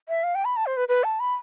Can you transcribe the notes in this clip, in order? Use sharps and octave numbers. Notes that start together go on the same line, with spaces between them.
E5
F5
G5
B5
A5
C5
B4
B4
A5
B5